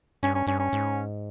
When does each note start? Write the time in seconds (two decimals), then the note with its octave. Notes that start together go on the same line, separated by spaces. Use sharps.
0.23 G2 C#4
0.35 C#4
0.47 G2 C#4
0.59 C#4
0.73 G#2